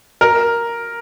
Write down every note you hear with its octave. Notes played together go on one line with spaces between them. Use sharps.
A#4